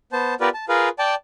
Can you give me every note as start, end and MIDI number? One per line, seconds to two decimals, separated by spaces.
0.12 0.34 59
0.12 0.34 72
0.12 0.34 81
0.40 0.49 59
0.40 0.49 65
0.40 0.49 67
0.40 0.49 70
0.40 0.49 71
0.40 0.49 74
0.54 0.65 81
0.69 0.89 65
0.69 0.89 68
0.69 0.89 70
0.69 0.89 71
0.69 0.89 77
0.99 1.15 74
0.99 1.15 79
0.99 1.15 81